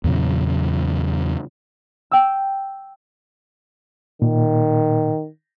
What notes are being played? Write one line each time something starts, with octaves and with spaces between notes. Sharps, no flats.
E2 A#2 C#3 F#3
G5 E6
A#2 D#3